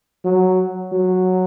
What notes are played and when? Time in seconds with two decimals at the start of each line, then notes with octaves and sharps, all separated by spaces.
0.25 F#3
0.92 F#3